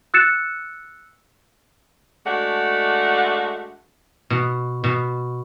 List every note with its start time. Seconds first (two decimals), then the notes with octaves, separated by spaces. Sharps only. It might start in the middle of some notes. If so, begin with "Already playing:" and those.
0.14 E6 F#6 A6 C#7 E7
2.26 G#3 A3 D4 F#4 E5 F#5
4.30 B2
4.84 B2